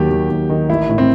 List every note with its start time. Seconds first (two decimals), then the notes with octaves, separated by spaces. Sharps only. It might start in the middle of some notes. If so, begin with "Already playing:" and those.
Already playing: D#2 D#3 F#3 G4
0.11 D#2
0.30 D#2
0.50 D#3
0.69 A1 E4
0.89 A2
0.98 C4